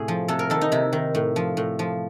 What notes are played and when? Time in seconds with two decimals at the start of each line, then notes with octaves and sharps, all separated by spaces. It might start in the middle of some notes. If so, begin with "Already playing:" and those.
Already playing: A2 C3 G#4
0.08 F3
0.28 C3 A4
0.39 A#4
0.50 D#3 A4
0.61 D#4
0.72 C3 E4
0.93 D#3
1.15 A2
1.36 F3
1.57 A2
1.79 F3